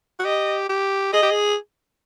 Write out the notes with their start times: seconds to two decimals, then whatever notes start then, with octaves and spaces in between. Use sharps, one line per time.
0.19 F#4
0.24 G4 D#5
0.69 G4
1.13 G#4 D#5
1.22 G4
1.31 G#4